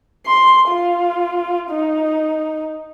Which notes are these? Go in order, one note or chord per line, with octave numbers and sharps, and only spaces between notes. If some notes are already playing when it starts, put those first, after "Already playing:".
C6
F4
D#4